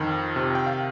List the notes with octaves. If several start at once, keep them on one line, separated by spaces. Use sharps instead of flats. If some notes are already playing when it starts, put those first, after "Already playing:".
Already playing: F2 D#3
C3
G5
F5